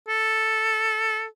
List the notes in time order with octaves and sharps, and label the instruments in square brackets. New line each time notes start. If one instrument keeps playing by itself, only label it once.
[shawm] A4